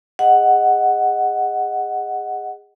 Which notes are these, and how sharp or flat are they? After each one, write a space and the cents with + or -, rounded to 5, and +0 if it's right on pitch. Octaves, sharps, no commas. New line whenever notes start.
G#4 -20 D#5 +0 F#5 +0